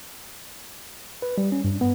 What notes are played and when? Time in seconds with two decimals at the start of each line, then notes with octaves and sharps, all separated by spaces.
1.22 B4
1.38 G3
1.52 C#4
1.64 G2
1.81 B3